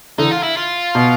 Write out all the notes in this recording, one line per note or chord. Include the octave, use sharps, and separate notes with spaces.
D3 E3 D#4
F4
E4
F4
B2